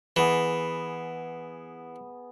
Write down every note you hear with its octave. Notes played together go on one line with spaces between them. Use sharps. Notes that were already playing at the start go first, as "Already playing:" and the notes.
E3 B3 G#4